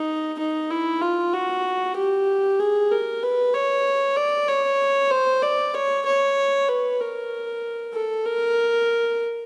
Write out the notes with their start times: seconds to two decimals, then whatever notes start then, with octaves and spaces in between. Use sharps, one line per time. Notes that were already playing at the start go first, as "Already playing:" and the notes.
Already playing: D#4
0.39 D#4
0.70 E4
1.01 F4
1.33 F#4
1.97 G4
2.59 G#4
2.91 A#4
3.23 B4
3.54 C#5
4.17 D5
4.49 C#5
5.11 C5
5.42 D5
5.75 C#5
6.06 C#5
6.69 B4
7.01 A#4
7.94 A4
8.26 A#4